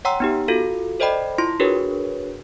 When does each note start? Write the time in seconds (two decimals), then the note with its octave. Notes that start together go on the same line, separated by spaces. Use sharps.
0.05 C#5 F#5 G5 A#5 C6 E6
0.20 B3 D#4 G4
0.48 F4 F#4 A4 F5
1.00 A4 C5 D5 D#5 G5 B5
1.38 E4 F4 C6
1.60 D4 F#4 G#4 A#4 B4 C#5